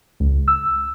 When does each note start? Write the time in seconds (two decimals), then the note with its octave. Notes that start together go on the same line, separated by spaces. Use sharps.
0.20 C#2
0.48 E6